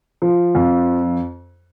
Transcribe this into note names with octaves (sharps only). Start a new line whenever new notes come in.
F3
F2